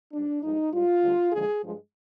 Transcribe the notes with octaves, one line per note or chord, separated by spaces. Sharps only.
G#2 G3 D4
G2 F3 G#3 D#4
G#2 G3 F4
D2 D3 G3
D#2 D3 F3 G#3 G#4
G2 F3 G#3